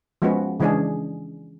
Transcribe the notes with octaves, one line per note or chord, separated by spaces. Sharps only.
F3 G#3 B3 C#4 F#4 B4
C#3 E3 G#3 C#4 D4 G#4